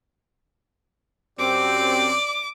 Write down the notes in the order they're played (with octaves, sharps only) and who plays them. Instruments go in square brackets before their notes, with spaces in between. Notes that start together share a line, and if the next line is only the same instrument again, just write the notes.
[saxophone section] F#2 C4 [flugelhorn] G4 [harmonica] D5 [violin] D6